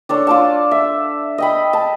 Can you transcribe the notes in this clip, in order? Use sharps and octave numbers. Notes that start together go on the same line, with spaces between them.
D4 A4 C#5
F4 D5 A5
E5
D#5 G5 B5
A5